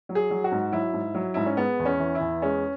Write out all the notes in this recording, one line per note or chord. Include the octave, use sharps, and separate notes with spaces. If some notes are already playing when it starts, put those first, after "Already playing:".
F#3
G#4
F#3
F#4
G#2
F#3 E4
G#2
F#3
G#2 E4
C#4
G#3 B3
E2
C#4
E3
E4
E2
G#3 C#4